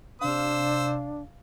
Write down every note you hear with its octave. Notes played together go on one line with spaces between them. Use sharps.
C3 D4 C5 F5 E6